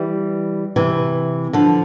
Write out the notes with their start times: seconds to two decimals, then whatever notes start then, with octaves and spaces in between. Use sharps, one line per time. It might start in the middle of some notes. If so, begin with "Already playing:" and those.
Already playing: E3 G3
0.76 C3 E3
1.53 D3 F3